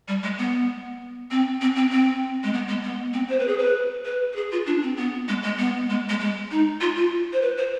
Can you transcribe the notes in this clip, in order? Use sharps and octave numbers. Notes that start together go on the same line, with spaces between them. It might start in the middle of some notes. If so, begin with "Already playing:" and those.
G3
G#3
B3
C4
C4
C4
C4
G#3
B3
G#3
B3
C4
C5
B4
G#4
B4
B4
B4
G#4
F4
D4
C4
B3
G#3
G#3
B3
G#3
G#3
G#3
D#4
F4
F4
C5
B4
C5